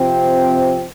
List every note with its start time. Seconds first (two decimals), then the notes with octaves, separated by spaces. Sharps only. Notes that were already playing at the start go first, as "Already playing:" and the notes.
Already playing: C3 F3 C4